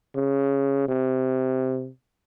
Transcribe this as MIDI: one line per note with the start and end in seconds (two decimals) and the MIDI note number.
0.16 0.86 49
0.88 1.88 48